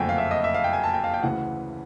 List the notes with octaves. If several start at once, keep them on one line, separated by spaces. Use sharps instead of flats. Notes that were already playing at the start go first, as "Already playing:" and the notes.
Already playing: F#1 F2 D3 F#3 A3 G5 G#5
F5
E5
D#5
E5
F5
G5
G#5
A5
G5
F5
G5
D2 C#3 E3 F#5